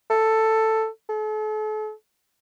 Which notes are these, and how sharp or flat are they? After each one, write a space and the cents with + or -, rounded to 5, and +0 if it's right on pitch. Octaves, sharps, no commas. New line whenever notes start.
A4 +5
A4 -40